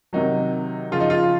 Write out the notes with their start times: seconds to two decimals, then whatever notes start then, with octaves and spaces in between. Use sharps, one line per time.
0.13 C3 D#3 F#3 D#4
0.92 C#3 F3 F4
1.00 D#4
1.10 F4